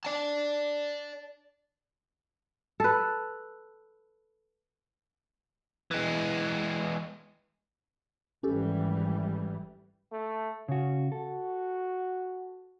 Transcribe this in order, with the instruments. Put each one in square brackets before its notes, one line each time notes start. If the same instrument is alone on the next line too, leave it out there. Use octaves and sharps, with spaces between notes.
[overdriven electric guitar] D5 A5
[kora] A4 B4
[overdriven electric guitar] E3 G#3
[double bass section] G#1 E3 G3 [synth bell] C#4 G4 A4
[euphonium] A3
[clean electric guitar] C#3 F#4 [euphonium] C#4
[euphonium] F#4 [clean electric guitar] A4